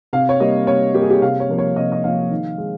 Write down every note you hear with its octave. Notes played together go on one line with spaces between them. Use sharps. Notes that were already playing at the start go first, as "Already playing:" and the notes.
C3 F5
C#5
G3 A#3 D#5
C3 C#5
G3 A#3 G4
G#4
G4
C3 F5
C#5
F3 A#3
C#5
C3 D#5
D#5
F3 A#3 F5
D#3
G#3